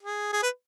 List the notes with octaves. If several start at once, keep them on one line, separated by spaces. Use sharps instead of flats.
G#4
G#4
B4